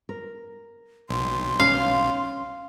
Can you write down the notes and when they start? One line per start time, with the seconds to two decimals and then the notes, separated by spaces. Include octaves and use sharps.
0.09 A#4
1.09 B1 C6
1.60 C#4 F5